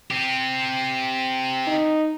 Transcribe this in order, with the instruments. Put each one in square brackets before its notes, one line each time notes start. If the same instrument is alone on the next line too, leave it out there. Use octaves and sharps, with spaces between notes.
[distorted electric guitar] C4 G4
[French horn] D#4